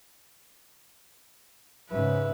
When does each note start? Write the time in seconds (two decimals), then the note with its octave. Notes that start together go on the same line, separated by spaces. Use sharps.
1.90 G#2 C#3 B4 E5